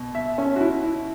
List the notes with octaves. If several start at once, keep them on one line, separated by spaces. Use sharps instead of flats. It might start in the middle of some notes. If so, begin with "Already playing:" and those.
Already playing: B2
E5
C#4
F#4
E4
E4